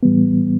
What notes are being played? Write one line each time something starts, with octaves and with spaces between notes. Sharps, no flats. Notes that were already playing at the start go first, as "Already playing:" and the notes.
A2 E3 G3 B3